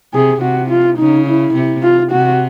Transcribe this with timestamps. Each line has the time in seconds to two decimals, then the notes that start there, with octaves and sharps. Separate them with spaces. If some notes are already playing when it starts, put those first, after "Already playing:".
0.14 C3 G#4
0.42 C3 F#4
0.70 F4
0.98 C#3 D#4
1.26 E4
1.55 C3
1.83 F4
2.12 C3 F#4